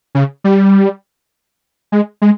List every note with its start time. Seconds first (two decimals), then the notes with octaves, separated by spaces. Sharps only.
0.15 C#3
0.44 G3
1.92 G#3
2.22 G#3